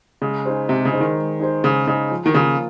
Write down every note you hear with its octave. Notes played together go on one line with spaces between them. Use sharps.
C#3 G#3
D#4 G#4 C5
C3 G#3
C#3
D#4 G#4 C5
D#3
G#3
D#4 G#4 C5
C#3 G#3
C#3 D#4 G#4 C5
F3
D#3
C#3 A#3 F4 A#4